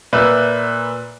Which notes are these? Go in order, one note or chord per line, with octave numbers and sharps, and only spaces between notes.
A#2 B4 E5